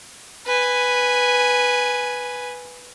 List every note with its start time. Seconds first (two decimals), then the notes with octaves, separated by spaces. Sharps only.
0.46 B4 G#5